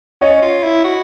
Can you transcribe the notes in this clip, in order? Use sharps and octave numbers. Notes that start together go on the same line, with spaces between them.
C#4 C#5 D#5
F4
E4
F#4